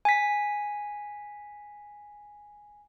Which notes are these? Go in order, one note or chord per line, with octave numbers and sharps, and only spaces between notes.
G#5 B6